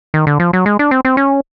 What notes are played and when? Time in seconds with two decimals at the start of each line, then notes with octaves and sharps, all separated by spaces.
0.14 D#3
0.27 D3
0.40 F3
0.53 F#3
0.66 G#3
0.79 D4
0.91 C4
1.05 C4
1.17 C#4